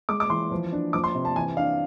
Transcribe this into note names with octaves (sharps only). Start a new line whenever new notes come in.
G#3 D6
D6
E3 C6
F3
D4
F3 D6
C6
C3
A5
E3 G#5
D4 F5